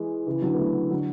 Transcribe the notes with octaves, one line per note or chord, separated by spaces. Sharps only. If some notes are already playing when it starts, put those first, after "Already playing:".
Already playing: E3 G#3
C#3 E3
D3 F#3
B3
F#3 A3
D3 F#3